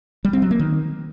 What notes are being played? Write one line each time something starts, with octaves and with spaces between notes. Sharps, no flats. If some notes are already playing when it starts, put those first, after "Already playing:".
G3
C4
F#3
A#3
D#3